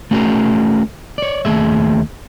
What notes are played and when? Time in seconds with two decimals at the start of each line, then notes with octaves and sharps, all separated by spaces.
0.11 A3 C#4 F#4 G#4 A#4
1.18 C#5 D5
1.45 D#2 A3 G#4 E5